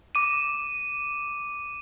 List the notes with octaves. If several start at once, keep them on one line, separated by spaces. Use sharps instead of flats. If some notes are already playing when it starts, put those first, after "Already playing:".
D6 D#7